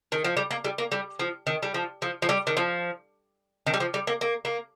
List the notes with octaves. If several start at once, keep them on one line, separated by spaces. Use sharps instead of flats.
D#3
F3
G3
A#3
G3
A#3
G3
F3
D#3
G3
F3
F3
F3
G3
D#3
F3
D#3
G3
F3
G3
A#3
A#3
A#3